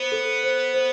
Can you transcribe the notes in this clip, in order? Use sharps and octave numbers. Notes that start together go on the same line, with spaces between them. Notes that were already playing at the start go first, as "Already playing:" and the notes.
Already playing: B3 C5
A4
C5
C5